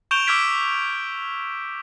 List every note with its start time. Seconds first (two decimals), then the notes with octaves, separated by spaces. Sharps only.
0.11 C#6 G6 D7 E7 F7 G7
0.27 D6 E6 F6 G#6 B6 D7